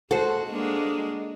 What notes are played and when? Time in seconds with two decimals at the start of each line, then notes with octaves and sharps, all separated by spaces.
0.11 G#3 F#4 A4 C5
0.51 G#3 A#3 D4